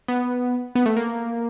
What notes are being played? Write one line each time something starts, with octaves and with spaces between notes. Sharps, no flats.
B3
B3
A3
A#3